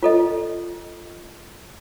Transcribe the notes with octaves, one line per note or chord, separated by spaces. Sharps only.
F4 A4 D#5